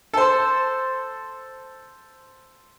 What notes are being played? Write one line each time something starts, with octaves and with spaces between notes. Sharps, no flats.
A4 C5